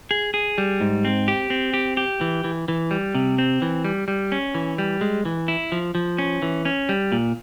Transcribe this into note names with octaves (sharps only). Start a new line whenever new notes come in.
G#4
G#4
G3
G#2
C4
G4
C4
G4
G4
E3
E3
E3
G3
C3
C4
E3
G3
G3
C#4
E3
G3
G#3
E3
E4
F3
F3
C#4
E3
C#4
G3
A#2